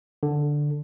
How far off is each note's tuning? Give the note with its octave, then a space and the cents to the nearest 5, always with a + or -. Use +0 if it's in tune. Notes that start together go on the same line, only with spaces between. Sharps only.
D3 +0